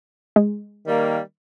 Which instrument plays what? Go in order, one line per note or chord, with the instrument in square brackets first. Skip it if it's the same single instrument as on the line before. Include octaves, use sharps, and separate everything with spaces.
[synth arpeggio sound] G#3
[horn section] D#3 G3 A#3